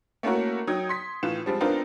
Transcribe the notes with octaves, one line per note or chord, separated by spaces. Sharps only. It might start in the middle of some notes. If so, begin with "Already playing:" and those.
A3 A#3 C#4 E4 F#4 A#4
F#3 D#4 G5 D#6 G#6
C6 B6
A2 D#3 E3 F4 E7
F3 G3 G#3 C4
B3 C4 D4 D#4 F4 A#4